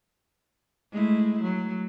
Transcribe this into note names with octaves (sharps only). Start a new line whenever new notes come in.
G#3 A3 E4
F#3